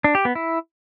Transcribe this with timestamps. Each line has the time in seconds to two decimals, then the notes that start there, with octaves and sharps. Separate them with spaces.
0.04 D4
0.15 G4
0.25 B3
0.35 E4